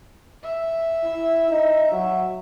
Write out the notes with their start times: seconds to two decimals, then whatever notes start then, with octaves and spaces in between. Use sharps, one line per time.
0.43 E5
1.04 E4
1.51 D#4
1.92 F#3